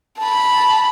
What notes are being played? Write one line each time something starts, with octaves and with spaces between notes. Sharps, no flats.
A5 B5